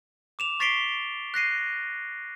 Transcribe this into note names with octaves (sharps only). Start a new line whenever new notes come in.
D6 E7 F7
C#6 A6 B6 C7 D7 G7
F#6 A#6 C7 D#7